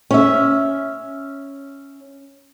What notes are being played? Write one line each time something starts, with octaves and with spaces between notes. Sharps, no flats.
C#4 E5